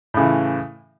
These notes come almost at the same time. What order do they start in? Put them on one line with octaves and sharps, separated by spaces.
A2 C#3 E3